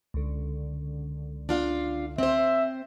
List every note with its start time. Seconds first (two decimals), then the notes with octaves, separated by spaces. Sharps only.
0.14 C#2 D3
1.49 D4 F4 F5
2.18 C4 C5 E5